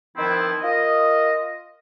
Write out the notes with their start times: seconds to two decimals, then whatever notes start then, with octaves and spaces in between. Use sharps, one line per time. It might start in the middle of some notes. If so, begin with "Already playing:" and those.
0.16 D#3 F3 B3 C4 E4
0.62 F4 A#4 D#5